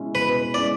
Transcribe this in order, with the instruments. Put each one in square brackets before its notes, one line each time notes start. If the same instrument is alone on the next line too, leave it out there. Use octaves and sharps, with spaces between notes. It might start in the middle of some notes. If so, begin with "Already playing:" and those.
Already playing: [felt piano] B2 G#3 C#4 E4
[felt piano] B2 [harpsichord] B4
[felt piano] G#3 C#4 E4 [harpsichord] D5